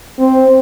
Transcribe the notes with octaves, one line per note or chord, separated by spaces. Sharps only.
C4